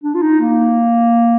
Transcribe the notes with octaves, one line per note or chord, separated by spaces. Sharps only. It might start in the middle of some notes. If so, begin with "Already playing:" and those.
D4
F4
D#4
A#3